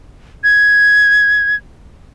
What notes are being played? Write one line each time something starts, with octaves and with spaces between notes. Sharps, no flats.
G#6